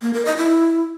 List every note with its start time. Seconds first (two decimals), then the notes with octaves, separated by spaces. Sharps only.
0.02 A#3
0.13 A#4
0.25 D#5
0.37 E4